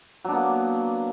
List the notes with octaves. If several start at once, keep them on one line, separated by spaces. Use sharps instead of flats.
F#3 A#3 B3 D4